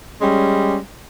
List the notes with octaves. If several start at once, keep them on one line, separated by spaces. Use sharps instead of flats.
G3 G#3 C#4